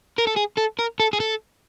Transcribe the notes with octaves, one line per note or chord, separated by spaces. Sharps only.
A#4
A4
G#4
A4
A#4
A4
G#4
A4